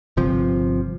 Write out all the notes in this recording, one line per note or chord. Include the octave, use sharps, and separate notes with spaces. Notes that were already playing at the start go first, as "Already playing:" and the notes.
G1 C3 F3